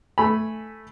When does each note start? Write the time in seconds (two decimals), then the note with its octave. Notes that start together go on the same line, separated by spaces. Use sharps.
0.18 A3 G#5 B5